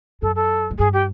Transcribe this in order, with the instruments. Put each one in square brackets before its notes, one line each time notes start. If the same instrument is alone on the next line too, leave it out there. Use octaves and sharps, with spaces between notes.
[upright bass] F#2 [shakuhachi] A4
[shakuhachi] A4
[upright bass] G#2
[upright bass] G2 [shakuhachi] G#4
[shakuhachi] G4